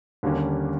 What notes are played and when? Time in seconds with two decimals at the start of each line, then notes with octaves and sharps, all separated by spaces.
0.23 D#2 D3 G3 A#3 C#4